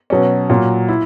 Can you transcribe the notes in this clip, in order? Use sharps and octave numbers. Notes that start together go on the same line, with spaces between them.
B2 F#3 C#4
A#2 F#3 A#3
E4